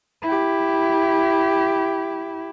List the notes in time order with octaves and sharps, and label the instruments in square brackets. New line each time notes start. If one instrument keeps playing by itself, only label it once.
[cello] E4 G4